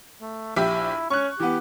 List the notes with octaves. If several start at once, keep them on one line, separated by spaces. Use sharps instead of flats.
A3
A#1 E4 G4 E5
C#4 C#6 F#6
E3 B3 G4